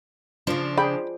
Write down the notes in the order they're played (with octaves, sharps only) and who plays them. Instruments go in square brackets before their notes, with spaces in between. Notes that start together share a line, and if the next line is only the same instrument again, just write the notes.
[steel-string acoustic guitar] C#3 D4 [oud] F3
[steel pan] G#4 D5 G5 [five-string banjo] B5